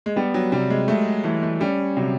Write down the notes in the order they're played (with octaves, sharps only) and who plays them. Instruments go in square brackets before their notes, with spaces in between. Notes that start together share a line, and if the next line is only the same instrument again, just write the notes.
[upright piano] G#3
[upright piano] G3 [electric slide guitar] B3
[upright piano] F#3
[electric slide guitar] C3 [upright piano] G3
[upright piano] G#3
[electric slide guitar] G#3 [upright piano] A3
[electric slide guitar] E3 [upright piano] A3
[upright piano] A3
[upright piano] G3 [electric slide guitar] C#4
[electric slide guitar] C3 [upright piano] F#3